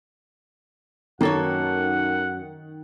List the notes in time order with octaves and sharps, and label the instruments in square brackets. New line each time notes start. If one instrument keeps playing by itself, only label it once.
[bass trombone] F#2 [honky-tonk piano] D#3 [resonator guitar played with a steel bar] A#3 A4 C#5 [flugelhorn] F#5